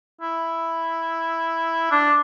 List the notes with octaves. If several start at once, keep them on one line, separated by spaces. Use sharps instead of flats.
E4
D4